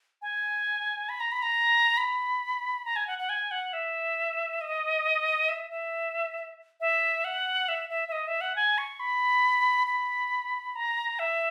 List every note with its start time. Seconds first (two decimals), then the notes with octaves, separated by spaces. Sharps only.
0.22 G#5
1.09 B5
1.20 A#5
1.32 B5
1.42 A#5
1.97 B5
2.85 A#5
2.96 G#5
3.07 F#5
3.18 F#5
3.29 G#5
3.51 F#5
3.73 E5
4.61 D#5
5.49 E5
5.71 E5
6.81 E5
7.24 F#5
7.69 E5
7.90 E5
8.08 E5
8.12 D#5
8.27 E5
8.41 F#5
8.56 G#5
8.78 C#6
9.00 B5
9.87 B5
10.75 A#5
11.19 E5